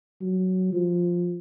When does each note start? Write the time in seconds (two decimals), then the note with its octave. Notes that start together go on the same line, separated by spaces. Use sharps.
0.21 F#3
0.73 F3